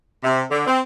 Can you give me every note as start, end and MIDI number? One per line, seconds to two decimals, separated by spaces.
0.23 0.42 48
0.50 0.66 50
0.66 0.78 60